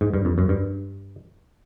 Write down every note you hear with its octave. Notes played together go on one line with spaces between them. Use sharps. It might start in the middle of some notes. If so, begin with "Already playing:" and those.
G#2
G2
F2
F#2
G2